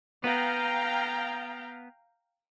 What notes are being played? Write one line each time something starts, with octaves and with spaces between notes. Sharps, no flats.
B3 F5 G5 A#5